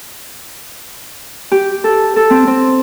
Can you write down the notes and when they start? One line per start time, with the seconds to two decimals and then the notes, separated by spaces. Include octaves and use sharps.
1.52 G4
1.84 A4
2.16 A4
2.30 C4
2.47 C4